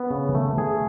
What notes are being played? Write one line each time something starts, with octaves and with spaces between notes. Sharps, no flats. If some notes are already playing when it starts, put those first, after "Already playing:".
Already playing: B3
C#3
A3
G#4